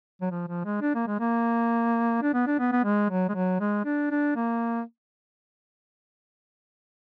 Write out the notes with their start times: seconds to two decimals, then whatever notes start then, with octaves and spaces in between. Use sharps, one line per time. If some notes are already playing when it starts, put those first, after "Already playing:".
0.22 F#3
0.31 F3
0.48 F3
0.65 G#3
0.82 D4
0.95 A#3
1.07 G#3
1.20 A#3
2.23 D4
2.34 B3
2.47 D4
2.59 B3
2.72 B3
2.84 G#3
3.10 F#3
3.29 G#3
3.35 F#3
3.61 G#3
3.85 D4
4.11 D4
4.36 A#3